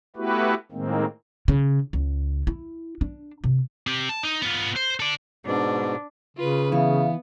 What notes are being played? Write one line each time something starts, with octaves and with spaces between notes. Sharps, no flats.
A3 B3 E4 F#4 G4 B4
A2 D#3 G#3 A#3 C4
C#3
C#2
E4
D4
C3
C4 G4
A5
D#4
B3 F4
C5
A4 D5
G#2 B2 D4
C#3 F4 B4
E3 B3 E5 F5